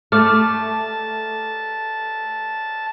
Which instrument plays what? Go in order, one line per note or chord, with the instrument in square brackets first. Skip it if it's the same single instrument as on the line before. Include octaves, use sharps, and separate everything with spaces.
[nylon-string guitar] A3 [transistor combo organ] A5 [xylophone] D6 F6